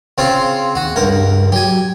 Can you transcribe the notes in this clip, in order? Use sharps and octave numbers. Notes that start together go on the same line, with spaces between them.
C#3 C4 F4
D#2 F#4
C#2 G2 A#4
F#3 G4 G#5